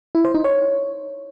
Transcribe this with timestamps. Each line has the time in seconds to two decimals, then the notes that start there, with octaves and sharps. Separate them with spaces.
0.15 E4
0.25 C5
0.34 D#4
0.44 C#5